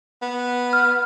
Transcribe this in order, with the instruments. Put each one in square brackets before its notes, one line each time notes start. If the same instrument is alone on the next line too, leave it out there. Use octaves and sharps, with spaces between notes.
[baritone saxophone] B3
[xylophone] F6